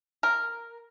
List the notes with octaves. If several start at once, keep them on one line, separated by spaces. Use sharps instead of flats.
A#4